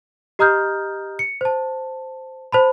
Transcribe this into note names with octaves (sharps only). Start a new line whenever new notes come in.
G4 D#5 A#5 D#6 F6 G6
C#7
C5 A5
C5 A5 B5